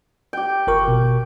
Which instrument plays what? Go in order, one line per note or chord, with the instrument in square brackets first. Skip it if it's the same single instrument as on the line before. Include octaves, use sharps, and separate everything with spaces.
[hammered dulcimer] G4 G5
[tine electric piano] G1 A#4 C#6
B2